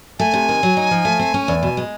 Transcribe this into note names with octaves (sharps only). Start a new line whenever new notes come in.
A3 G#5
C3
D#3
F#3
D#4
F3
A3
C4
C#4
E2
B2
G#3